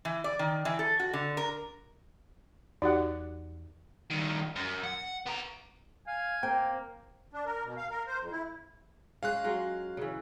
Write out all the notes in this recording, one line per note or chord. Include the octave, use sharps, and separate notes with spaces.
E3
D5
D#3
E3
A4
F#4
D3
A#4
E2 D#4 F#4 G4 D5 F#5
G2 D#3
F#2
F#5
B3 A#5
F5 G#5
A#3 C4 G5
D4
A#4
B2
F5
A#4
C5
F2
E4
G#3 C#4 F5 F#6
F#3 G#3 F4
C#3 E3